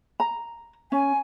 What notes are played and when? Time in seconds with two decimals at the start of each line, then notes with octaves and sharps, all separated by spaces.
0.20 A#5
0.92 C#4 G#5